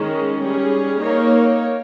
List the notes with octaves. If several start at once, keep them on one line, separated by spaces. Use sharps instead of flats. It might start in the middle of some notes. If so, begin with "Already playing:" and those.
Already playing: D#3 G#3 C#4 G#4
G3 C#4 G#4
A#3 D#4 A#4 C#5